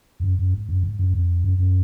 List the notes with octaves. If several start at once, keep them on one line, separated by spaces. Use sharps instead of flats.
F2
F#2
F#2
G#2
F#2
G#2
F#2
F2
F#2
F#2